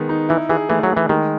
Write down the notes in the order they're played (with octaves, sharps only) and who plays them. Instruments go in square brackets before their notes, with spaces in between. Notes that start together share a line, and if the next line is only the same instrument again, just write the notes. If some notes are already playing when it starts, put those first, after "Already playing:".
Already playing: [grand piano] D#3 G#3 B3 B4
D#4
[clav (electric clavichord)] E3 [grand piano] E4
[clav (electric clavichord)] E3 [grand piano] G#4
[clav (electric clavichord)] E3 [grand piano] A3
[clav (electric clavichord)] F#3
[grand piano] A3
[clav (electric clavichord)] E3
[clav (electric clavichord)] D#3 [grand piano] G#3